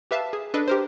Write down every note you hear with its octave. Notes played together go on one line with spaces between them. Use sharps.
G4 B4 E5 F5 A5
G#4
D4 A4 B4 D#5
G4 A#4 C5